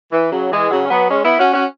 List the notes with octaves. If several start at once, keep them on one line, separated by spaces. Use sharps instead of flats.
E3
C#3 F#3
E3 G#3
C#3 F#3
C#4
F#3 B3
G#3 C#4
B3 E4
C#4 F#4
C#4 F#4